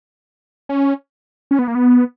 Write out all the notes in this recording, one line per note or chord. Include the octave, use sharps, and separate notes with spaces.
C#4
C#4
B3
A#3
B3